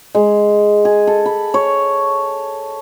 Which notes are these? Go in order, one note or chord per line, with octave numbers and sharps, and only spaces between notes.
G#3
G#4
A4
B5
C#5